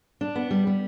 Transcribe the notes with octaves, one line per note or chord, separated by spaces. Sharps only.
D4
B3
G3
G3